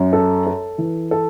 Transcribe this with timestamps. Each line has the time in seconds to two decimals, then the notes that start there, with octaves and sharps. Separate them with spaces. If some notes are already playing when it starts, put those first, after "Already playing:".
Already playing: F#2
0.13 A4
0.46 A4
0.78 E3
1.11 A4